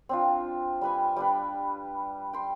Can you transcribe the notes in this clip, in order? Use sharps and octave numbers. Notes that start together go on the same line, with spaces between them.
C4 D4 F4
G3 B4 G#5
G3 D4 B4
G5 C6